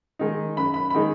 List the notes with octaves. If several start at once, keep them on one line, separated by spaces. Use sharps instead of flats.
D#3 G#3 D#4
F#2 B5
B5
B5
D#3 G#3 D#4